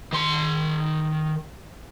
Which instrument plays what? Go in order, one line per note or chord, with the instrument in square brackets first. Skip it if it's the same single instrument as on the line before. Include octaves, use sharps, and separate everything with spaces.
[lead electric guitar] D#3 C6